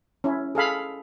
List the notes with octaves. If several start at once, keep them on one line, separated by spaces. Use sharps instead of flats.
C#4 E4
G#4 A4 F5 B5